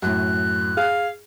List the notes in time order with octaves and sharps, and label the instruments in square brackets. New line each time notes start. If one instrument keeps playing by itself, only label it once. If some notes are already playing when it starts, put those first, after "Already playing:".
[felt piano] F#2 A2 [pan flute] F#6
[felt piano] G#4 [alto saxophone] F5